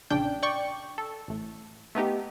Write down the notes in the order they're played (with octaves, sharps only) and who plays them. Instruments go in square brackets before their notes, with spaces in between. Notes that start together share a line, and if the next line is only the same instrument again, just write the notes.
[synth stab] A#1 C#3 D4 G5
D5 G5 C#6
A4
A1 A2
A3 B3 D#4 G4